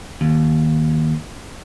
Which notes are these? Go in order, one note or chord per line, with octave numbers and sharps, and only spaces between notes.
D#2